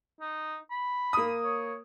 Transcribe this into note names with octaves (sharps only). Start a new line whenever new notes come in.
D#4
B5
A#3 D#6
C#5